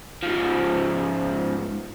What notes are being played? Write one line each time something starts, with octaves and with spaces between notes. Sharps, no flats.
G#2 F3